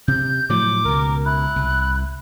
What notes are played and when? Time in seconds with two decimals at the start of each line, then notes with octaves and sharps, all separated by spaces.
0.08 C3 G6
0.50 A2 F3 F#3 D6
0.85 C#2 B2 A#4
1.25 E4 F#6
1.56 C2